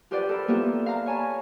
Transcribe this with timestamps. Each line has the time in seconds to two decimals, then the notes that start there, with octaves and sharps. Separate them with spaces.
0.11 F4 G4 B4 C5 D5 F#5
0.29 A4 A#4 B5
0.48 A#3 B3 E4 F4 G4 A4
0.86 F5 A#5
1.06 C#5 G#5 A5 B5